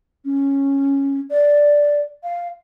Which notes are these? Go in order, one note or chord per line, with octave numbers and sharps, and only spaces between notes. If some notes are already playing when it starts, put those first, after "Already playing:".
C#4
D5
F5